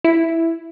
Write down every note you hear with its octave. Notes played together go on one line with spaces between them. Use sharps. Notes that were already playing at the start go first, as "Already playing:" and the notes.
E4